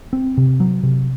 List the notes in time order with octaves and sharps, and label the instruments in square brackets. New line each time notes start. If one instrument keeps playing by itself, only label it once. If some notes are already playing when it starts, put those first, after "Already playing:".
[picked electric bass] C4
C3
F#3
C3